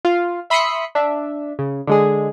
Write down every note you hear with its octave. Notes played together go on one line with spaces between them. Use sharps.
F4 F5
E5 B5 C6 D#6 B6 C#7
D4 E5
C#3
D3 G#3 G#4